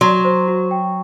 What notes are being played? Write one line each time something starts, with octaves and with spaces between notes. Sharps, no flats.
F#3 C6
C5
F#4
G5